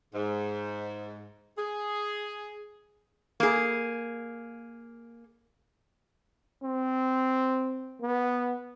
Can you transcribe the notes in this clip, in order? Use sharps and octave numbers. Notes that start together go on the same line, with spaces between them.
G#2
G#4
A#3 G#4
C4
B3